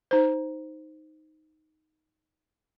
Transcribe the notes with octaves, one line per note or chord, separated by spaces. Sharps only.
D#4 C5